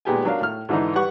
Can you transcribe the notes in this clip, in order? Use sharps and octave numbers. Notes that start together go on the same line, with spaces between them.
A#2 G#3 B3 G4 G5 G#5
F#3 D4 A#4 F5
A2 F6
G#2 D3 E3 D4 D#4
G3 B4 F#5 C#6